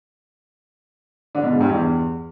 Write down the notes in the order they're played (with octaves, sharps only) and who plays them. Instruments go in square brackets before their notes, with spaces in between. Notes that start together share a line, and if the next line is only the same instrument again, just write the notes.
[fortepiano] D3
B2
G#2
G2
E2